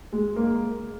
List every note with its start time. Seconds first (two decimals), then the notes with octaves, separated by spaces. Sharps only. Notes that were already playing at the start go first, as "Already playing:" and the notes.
0.12 G#3
0.36 A#3